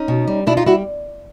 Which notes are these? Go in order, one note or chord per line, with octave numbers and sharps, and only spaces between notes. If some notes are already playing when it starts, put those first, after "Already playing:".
Already playing: C#4 D#4
B2
G3
B2 D4 E4
D#4 F4
G3 E4 F#4